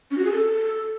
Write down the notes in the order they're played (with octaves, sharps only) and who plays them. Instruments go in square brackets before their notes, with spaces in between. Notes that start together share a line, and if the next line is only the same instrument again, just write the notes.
[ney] C#4
F#4
G#4
A4